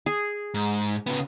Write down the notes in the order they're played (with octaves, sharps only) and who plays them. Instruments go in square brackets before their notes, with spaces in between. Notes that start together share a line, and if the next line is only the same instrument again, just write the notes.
[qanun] G#4
[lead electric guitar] G#2
C#3 B3